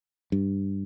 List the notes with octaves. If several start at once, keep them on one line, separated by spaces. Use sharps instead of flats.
G2